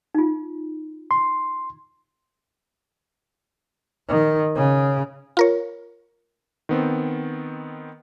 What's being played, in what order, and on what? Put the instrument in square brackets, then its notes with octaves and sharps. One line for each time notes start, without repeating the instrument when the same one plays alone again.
[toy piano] D#4 F4
[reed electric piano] C6
[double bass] D#3
C#3
[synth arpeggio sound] F4 A#4 C#5
[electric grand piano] D#3 B3 C4